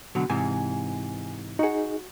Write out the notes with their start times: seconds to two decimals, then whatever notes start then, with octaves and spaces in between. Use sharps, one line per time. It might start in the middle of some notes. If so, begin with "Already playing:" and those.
0.15 B2 D3 F#3
0.30 G#2 C3 E3 G#5
1.59 D#4 F#4 G#4 F#5